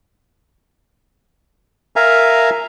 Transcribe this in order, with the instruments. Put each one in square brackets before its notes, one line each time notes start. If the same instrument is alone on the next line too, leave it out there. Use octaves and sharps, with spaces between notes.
[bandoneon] A#4 E5 F5 G#5 A#5